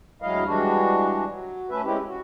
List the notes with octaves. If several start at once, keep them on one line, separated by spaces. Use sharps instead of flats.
D2 F#3 G#3 E4 D#5 F5
E3 G3 G#3 D4 F#4
F#3
A3 C#4 B4 E5
G#3 C4 C#4 E4 G4
F#4